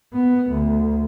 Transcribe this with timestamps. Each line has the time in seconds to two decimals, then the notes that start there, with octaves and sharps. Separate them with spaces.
0.14 B3
0.51 D2